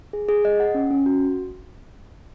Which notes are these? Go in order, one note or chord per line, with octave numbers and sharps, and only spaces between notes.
G#4
G#4
D#5
F#5
C#4
C#4
F#4